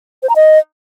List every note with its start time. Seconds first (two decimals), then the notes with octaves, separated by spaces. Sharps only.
0.23 C5
0.29 A#5
0.36 D#5